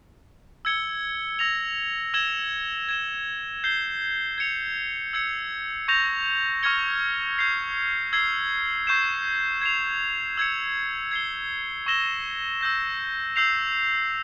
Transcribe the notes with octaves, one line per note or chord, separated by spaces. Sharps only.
E6 G#6 C#7 G7
E6 A#6 F7
E6 G#6 E7 G7
G#6 E7 G7
G6 C7 G7
G#6 C#7 F7
E6 G#6 C#7
C#6 G6 A#6 F7
C#6 F6 G#6 C#7 G7
G6 C7 F7
E6 G#6 C7 G7
C#6 G6 C7 E7
G#6 C7 F7
E6 G#6 C#7
G#6 C7 G7
C#6 E6 A#6 E7 G7
E6 G6 A#6
E6 G6 C7 F7